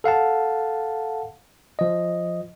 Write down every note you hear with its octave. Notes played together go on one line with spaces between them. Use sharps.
A4 F5 F#5 A5
F3 D#5